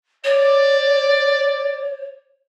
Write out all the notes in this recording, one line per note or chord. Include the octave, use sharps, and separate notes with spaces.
C#5 D5